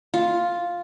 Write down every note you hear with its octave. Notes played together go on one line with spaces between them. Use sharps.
F4